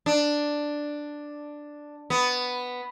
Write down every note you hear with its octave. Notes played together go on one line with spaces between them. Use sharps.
D4
B3